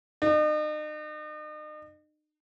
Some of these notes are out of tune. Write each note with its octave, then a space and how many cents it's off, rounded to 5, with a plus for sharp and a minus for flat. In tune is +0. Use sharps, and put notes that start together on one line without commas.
D#4 -40